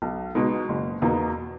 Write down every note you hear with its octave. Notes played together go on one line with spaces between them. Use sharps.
B1
B2 G#3 D#4
F#1
E2 B2 A#3 D#4